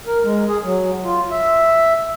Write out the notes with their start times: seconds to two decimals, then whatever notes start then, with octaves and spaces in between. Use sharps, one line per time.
0.07 A#4
0.24 G#3
0.49 G#4
0.63 F#3
1.04 F4
1.31 E5